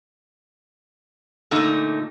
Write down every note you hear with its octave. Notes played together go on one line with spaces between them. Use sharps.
A#2 D3 A3 D#4